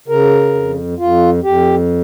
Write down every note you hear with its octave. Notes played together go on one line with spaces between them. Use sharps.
C#3 A#4
F2
F2 F4
F2 G4